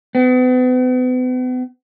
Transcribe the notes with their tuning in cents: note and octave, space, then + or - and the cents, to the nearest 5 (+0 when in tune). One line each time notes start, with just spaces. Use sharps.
B3 +40